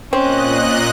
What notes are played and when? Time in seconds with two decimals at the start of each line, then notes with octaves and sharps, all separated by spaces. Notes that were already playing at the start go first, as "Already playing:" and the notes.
0.13 A#2 C4 C#4 D#5 F#6